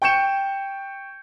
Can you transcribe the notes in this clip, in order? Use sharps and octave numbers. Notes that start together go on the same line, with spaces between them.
G5 C#6 G6 C#7 E7